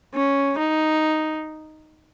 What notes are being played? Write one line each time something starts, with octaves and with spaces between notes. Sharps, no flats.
C#4
D#4